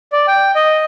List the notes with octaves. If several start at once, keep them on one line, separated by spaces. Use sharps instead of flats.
D5
G5
D#5